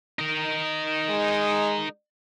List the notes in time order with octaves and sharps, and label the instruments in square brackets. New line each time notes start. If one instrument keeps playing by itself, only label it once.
[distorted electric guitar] D#4 A#4
[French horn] G#3